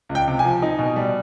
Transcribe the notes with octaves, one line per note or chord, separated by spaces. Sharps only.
C#2
G5
C3
F3 G#5
D#4
B2
G3